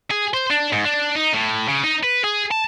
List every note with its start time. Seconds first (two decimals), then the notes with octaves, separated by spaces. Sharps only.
0.11 G#4
0.34 C5
0.51 D4
0.73 G#2
0.85 D4
1.15 D#4
1.34 A2
1.68 C#3
1.83 D#4
2.03 B4
2.24 G#4
2.51 A5